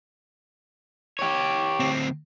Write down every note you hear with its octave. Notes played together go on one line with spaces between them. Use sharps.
G4 C#5
D2 C4